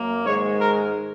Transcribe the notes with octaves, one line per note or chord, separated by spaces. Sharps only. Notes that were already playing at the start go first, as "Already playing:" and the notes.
Already playing: F#2 A#3
G#2 D#3 G#3 C#5
A#4